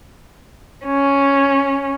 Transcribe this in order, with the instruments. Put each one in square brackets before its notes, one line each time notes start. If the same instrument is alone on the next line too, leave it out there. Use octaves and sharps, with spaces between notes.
[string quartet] C#4